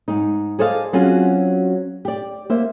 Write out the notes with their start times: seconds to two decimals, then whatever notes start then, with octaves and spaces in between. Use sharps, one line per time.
0.08 G#2 D#4
0.59 G#4 A4 C5 D5 D#5 F5
0.93 F#3 C4 C#4 F4 F#4 G#4
2.05 G4 D5
2.50 A#3 C5 E5